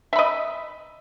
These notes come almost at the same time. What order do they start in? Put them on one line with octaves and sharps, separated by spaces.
E5 B5 D#5